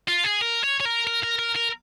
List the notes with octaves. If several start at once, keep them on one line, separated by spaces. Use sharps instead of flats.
F4
G#4
A#4
C#5
C#5
A#4
A#4
A#4
A#4
A#4